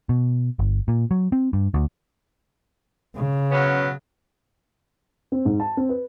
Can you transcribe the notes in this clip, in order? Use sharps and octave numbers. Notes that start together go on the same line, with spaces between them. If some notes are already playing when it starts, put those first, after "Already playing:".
B2
G1
A#2
F#3
C4
G2
D2
C#3
F#3 B3 C#4
C4
G#2
A5
C4
B4